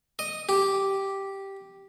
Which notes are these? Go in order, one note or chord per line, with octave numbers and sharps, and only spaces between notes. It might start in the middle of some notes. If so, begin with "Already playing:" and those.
D#5
G4